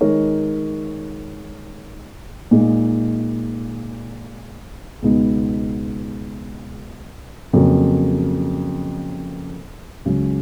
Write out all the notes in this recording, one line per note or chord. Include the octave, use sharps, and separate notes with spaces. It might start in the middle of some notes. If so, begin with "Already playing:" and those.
D#3 G#3 D#4 A#4 C#5
A#2 G#3 D#4
C#2 B2 G#3 B3 D#4
F2 C#3 F#3 A#3
C#2 C#3 F#3